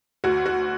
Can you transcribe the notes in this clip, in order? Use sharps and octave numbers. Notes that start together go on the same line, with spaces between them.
D2 F#4
F#4